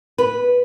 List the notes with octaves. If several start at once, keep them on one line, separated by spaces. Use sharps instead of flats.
B4